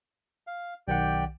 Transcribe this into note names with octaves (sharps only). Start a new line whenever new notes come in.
F5
B1 D#3 G4 D5 F#5 G5